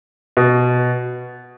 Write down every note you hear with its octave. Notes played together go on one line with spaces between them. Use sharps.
B2